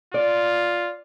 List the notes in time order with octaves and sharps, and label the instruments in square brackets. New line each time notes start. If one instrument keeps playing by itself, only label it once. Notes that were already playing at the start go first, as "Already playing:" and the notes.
[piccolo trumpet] F4 [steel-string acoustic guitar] D5